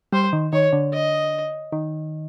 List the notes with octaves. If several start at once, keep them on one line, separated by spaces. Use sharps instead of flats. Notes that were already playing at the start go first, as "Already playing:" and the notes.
G3 C5
D#3
D#3 C#5
D3
D#5
D#3